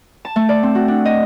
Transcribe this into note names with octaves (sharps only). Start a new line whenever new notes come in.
A5
A3
D5
C4
F#4
D4
D#5